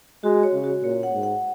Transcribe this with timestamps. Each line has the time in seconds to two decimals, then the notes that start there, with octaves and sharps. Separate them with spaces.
0.23 G#3 F#4
0.43 C#5
0.54 C#3
0.64 F#4
0.83 A#2 C#5
1.03 F#5
1.13 G#2
1.23 F#5